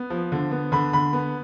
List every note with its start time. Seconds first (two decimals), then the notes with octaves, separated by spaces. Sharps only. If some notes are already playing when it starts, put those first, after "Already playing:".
Already playing: B3
0.10 F3
0.32 D3
0.51 B3
0.72 D3 B5
0.93 D3 B5
1.13 B3